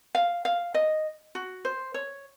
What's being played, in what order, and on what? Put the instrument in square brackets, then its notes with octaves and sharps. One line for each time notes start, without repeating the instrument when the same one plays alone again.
[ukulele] F5
F5
D#5
F#4
C5
C#5